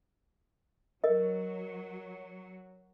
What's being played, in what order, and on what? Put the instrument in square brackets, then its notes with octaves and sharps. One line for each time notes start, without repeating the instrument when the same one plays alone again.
[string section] F#3 [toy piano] A#4 D#5